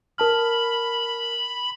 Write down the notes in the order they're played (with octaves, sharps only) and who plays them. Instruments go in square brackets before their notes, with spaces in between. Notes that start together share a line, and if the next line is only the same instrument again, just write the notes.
[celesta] A#4 A5 F6 [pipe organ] B5